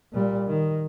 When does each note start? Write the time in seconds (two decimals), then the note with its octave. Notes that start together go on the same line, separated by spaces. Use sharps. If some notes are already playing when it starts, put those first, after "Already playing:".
0.13 A#2 G3
0.47 D#3